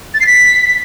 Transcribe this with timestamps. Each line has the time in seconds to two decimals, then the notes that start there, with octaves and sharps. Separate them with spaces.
0.14 A6
0.20 C7
0.27 B6